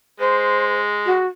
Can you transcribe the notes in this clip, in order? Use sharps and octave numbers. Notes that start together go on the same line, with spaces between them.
G#3 C5
F#4